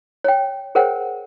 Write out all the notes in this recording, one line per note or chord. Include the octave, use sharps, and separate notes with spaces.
C#5 G5
G#4 A#4 C5 C#5 F#5 G5